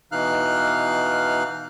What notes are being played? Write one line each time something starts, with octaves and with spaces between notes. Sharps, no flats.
B2 E3 D#4 F5 F6 F#6